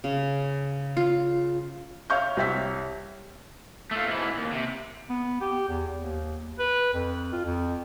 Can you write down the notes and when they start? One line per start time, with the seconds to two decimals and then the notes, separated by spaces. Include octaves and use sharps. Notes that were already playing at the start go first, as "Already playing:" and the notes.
0.04 C#3
0.97 F4
2.10 C#5 E5 F5 C#6 G6
2.37 C2 C4 C#5 E5 B6
3.91 A3 F4
4.08 G#2 E3
4.37 D#2
4.53 C3
5.10 B3
5.41 G4
5.68 E2
5.97 D#2
6.59 B4
6.93 F2
7.33 F4
7.44 F2